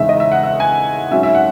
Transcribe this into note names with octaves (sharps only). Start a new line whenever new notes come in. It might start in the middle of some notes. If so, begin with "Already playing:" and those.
Already playing: E2 C#3 G#3 D#4 E5
D#5
E5
F#5
E5
G#5
G#2 F#3 C#4 E5
E5
F#5